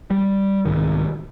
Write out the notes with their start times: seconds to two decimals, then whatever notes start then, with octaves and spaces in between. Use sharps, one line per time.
0.11 G3
0.66 C2 G#2 D#3